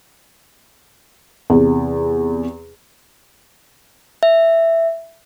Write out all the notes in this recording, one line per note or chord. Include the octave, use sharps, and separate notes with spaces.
E2 C3
E5